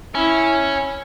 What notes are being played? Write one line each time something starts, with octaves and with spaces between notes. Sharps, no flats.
C#4 E4